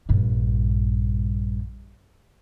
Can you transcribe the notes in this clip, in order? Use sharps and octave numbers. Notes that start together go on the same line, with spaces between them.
A#1 G2